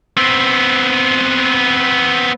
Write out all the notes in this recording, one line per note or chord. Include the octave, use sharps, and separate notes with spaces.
B3 C4